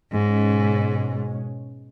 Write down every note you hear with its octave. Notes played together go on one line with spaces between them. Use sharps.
G#2 B2 G#3 C#4